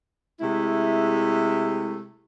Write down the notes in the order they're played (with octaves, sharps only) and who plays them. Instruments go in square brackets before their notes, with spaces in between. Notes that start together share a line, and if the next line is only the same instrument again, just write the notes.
[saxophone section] C3 G#3 A3 E4